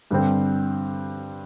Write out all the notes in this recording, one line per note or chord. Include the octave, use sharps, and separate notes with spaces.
G2 D3 G3 C4